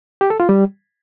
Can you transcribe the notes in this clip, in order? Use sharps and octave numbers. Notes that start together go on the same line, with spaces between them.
G4
A4
F4
G3